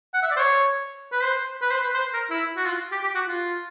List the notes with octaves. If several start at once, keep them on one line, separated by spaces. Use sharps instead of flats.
F#5
E5
D5
C5
C#5
B4
C5
B4
C5
B4
C5
A#4
E4
F#4
F4
G4
G4
F#4
F4